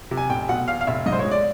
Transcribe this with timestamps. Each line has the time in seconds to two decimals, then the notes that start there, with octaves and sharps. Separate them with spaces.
0.11 C3
0.17 G#5
0.30 F1 G5
0.49 B2 F#5
0.68 E2 F5
0.81 F5
0.87 F1 E5
1.06 G#2 D#5
1.13 C5
1.19 C#5
1.25 G#3
1.31 D5